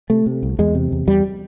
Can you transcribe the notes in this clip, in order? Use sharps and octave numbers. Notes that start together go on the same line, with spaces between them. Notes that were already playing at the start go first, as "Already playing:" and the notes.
C3 A3
C3
C2
E2 G#3
C3
E2
E2 G3